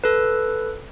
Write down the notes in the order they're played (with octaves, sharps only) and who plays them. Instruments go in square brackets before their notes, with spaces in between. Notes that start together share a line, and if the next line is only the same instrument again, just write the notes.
[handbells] A4 B4